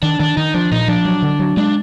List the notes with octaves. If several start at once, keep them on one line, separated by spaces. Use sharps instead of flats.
D#3 D4
D#3 D4
D#3 D#4
F3 D4
A#2 D#4
F3 D4
F#3
D3
F#3
G#3 D4